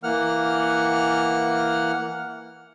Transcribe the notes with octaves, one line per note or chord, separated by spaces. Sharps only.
E3 A#3 F#5 F6